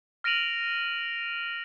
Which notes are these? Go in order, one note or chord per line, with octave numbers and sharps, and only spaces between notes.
F6 A#6 D7 D#7 F7 F#7